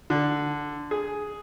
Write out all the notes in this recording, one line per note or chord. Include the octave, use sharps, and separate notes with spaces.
D3
G#4